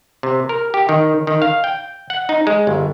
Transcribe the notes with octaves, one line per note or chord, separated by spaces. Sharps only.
C3
A#4
G4
D#3
D#3
F5
G5
F#5
D#4
G#3
G1